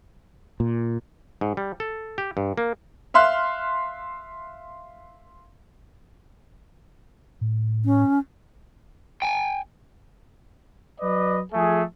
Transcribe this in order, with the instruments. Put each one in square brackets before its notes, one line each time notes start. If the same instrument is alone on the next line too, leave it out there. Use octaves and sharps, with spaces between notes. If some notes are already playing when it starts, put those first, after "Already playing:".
[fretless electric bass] A#2
[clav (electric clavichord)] G#2
G3
A4
G4
G2
A#3
[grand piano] E5 F5 C6 F6 F#6
[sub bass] A2
[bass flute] C#4
[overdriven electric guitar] G5 G#5
[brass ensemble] F#3 B4 D5 D#5
F3 A3 G#4